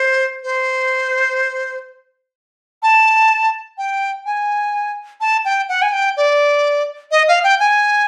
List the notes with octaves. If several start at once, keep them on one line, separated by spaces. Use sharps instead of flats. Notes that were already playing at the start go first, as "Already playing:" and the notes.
Already playing: C5
C5
A5
G5
G#5
A5
G5
F#5
G#5
G5
D5
D#5
F5
G5
G#5